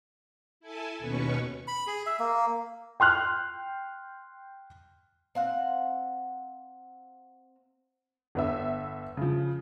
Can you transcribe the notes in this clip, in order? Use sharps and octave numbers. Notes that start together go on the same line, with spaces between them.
E4 A4 G#5 A5
D#2 B2 C#4 B4 C#6
B5
G#4
E5
A#3
G5 C6 F6 F#6
C4 F5 F#5
G1 B3 E5
C#3 F3